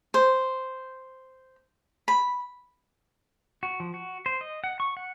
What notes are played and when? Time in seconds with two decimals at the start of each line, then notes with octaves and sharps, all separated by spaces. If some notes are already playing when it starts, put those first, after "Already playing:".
0.14 C5
2.08 B5
3.63 F#4
3.80 F3
3.94 F#4
4.26 C5
4.41 D#5
4.64 F#5
4.80 C#6
4.97 F#5